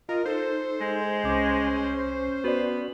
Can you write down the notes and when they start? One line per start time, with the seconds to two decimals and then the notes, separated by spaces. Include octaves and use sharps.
0.09 F4 A#4 D#5
0.26 D#4 A4 C5
0.81 G#3
1.24 C2 C#4 D6
2.44 B3 F#4 D5